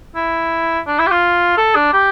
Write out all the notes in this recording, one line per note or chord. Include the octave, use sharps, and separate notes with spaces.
E4
D4
E4
G4
F4
A4
D4
G4